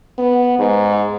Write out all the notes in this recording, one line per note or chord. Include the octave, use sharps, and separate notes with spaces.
B3
G#2